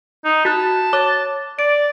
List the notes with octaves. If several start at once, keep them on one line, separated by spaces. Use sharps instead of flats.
D#4
F#4 A5 F#6
C#5 D6
D5 D7